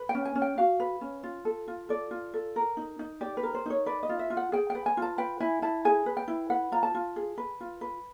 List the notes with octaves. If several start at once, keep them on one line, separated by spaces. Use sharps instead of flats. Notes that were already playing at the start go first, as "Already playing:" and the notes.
Already playing: B4
G5
C#4
G#5
C#4
G5
F#4 F5
B4
C#4
F4
A4
F4
A4 D5
F4
A4
A#4
D#4
D#4
G4 D5
B4
A#4
C5
D#4 C#5
B4 D5
D#5
F4
E5
F4
F#5
G#4 G5
G5
B4
G#5
F4
A5
B4 G5
E4 G#5
E4 A5
G#4 G#5
B4
G5
E4
B4 F#5
F4 A#5
A5
F4
G#4
B4
F4
B4